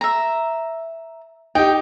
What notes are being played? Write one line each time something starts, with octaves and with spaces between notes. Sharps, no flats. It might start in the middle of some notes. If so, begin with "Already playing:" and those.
E5 A#5
D#4 G4 G5